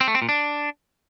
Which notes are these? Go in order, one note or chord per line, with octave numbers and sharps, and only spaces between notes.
C4
A3
C4
A#2
D4